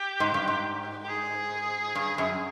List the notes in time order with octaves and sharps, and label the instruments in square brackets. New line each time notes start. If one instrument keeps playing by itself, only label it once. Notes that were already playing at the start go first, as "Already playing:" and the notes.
Already playing: [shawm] G4
[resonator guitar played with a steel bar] G#2
G2
G#2
[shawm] G4
G#4
[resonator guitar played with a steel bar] G2
F#2